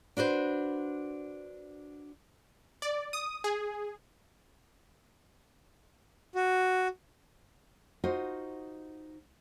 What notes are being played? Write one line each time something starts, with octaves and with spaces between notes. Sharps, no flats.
D4 F#4 B4 C5
D5
D#6
G#4
F#4
D#4 F4 F#4 C5 D#5